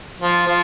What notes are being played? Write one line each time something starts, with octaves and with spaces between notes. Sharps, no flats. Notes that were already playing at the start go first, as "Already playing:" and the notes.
F3
F3